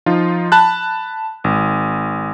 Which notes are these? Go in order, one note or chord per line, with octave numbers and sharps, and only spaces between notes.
F3 D#4 F4
A5 B5 F#6
G#1